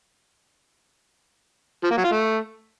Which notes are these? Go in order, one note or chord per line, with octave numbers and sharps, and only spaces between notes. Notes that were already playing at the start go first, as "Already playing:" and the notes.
F3
A#3
F#3
F4
A3